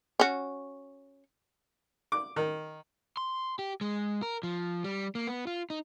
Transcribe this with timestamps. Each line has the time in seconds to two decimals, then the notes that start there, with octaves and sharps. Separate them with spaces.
0.19 C#4 F#4
2.12 D6
2.36 D#3
3.17 C6
3.59 G4
3.81 G#3
4.22 A#4
4.43 F3
4.84 G3
5.15 A#3
5.27 B3
5.47 F4
5.70 D#4